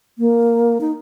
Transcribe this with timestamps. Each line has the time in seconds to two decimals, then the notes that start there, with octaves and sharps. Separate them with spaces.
0.18 A#3
0.81 D#4